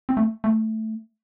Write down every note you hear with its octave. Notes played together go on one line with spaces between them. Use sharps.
C4
A3
A3